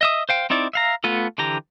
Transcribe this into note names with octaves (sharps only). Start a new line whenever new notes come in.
D#5 E5 D#6
C5 F5 G5
C4 D#4 E4 D5
E5 F5 A#5
A3 B3 F4 A4
D3 E3 G4 A#5